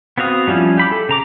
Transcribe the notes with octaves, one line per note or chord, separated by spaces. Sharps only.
B3 C4 F#4 F5 D#6
F3 G3 C#4 E4 F4
G4 B5 D6
A4
C#3 A#5 D6